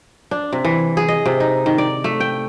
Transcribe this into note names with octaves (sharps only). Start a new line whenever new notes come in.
D4
C3
E3
G#4
D#5
C3
D#4
D#3
D5
A3
G5